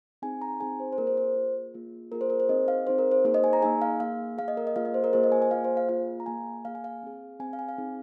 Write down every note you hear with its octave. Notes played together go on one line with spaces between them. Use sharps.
C4 D#4 G#4 G#5
A#5
C4 D#4 G#4 G#5
C5
C5
A#3 F4 G#4 A#4
C5
C5
A#3 F4 G#4
A#3 F4 G#4
A#3 F4 G#4 A#4
C5
A#4
C5
C4 D#4 G#4 D#5
F5
C4 D#4 G#4 C5
A#4
C5
A#3 D#4 G#4 C5
D#5
G#5
A#5
A#3 D#4 G#4 G#5
F5
A#3 G#4 F5
A#3 G#4 F5
D#5
A#4
D#5
A#3 F4 G#4 F5
D#5
C5
A#4
A#3 F4 G#4 C5
D#5
G#5
G#5
A#3 F4 G#4 F5
C5
F5
A#3 F4 G#4 F5
A#5
A#3 G#4 G#5
A#3 G#4 F5
G#5
F5
C4 G#4
C4 G#4 G#5
F5
G#5
F5
C4 D#4 G#4